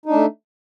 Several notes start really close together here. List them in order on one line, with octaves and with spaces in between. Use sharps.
D#4 D4 A3